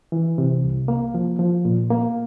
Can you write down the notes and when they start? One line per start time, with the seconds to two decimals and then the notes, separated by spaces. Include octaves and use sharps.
0.12 E3
0.38 C3
0.64 C2
0.88 A#3
1.14 F3
1.39 F3
1.65 A#2
1.90 A#3